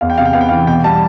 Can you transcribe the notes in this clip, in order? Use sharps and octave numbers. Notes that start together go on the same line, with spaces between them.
E2 F5
G5
C3 F5
G5
B3 F5
G5
E3 F5
B2 G5
G3 A5